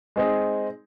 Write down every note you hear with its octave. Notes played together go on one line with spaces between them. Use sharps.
G#3 C4 D#4 G#4